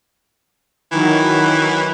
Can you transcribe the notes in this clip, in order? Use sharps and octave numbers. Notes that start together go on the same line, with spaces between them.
D#3 E3 F#3